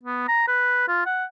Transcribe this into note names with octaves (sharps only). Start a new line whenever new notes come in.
B3
A#5
B4
F4
F#5